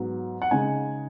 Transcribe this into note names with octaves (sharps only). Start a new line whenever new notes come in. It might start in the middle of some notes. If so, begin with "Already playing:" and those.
Already playing: G#2 F#3 B3
F#5
C#3 G#3 D#4 G#5